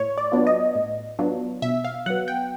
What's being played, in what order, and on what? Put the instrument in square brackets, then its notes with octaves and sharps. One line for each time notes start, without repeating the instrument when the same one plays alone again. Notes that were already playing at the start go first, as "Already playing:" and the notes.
Already playing: [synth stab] A2 C#5
D5
F#3 B3 D4 F4
D#5
A2
F#3 B3 D4 F4
B2 E5
F5
F#3 B3 F#5
G5